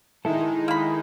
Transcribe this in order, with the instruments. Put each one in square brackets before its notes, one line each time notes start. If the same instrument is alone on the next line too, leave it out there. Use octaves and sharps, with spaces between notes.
[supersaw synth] D#3 G#3 D#4 [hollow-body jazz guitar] E4 A4
[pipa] A#3 B5